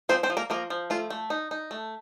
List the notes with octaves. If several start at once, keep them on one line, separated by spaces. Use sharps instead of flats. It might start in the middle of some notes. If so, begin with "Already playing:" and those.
F3 C4 C5
C4 C5
F3
A#3 A#4
F3 A#3 A#4
F3
A3 F4
A3
D#4
D#4
A3